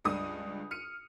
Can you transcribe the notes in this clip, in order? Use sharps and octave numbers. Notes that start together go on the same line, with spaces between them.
C#2 G2 D4 D#6
F6 C#7 D#7